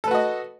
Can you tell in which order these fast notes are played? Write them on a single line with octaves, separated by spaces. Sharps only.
A4 B4 F#4 D#5